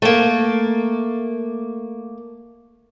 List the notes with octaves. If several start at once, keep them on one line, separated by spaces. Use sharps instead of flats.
A3 A#3